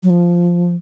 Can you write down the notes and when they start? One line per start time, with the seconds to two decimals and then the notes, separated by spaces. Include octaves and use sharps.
0.03 F#3
0.10 F3